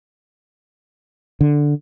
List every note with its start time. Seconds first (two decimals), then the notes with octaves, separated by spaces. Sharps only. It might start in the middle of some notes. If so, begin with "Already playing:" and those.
1.41 D3